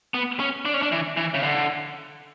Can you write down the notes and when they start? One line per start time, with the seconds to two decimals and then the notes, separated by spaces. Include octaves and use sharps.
0.14 B3
0.40 C#4
0.65 D4
0.74 C#4
0.82 D4
0.92 E3
1.17 E3
1.34 C#3
1.43 D3